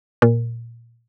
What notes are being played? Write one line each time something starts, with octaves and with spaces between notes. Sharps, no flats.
A#2